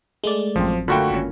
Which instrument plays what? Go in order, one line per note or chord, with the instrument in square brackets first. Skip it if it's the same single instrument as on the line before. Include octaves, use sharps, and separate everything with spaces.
[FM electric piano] G#3 A3 D5
[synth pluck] A1 F#2 C4 [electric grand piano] F3
[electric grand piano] D3 F#4 G5 [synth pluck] A3 A#3 F4 [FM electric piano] B5 C#6
[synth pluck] G#1 C#4